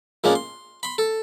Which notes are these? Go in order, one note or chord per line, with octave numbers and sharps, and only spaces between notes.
A#2 G#3 C#4 D4
C6
B5 C6
A4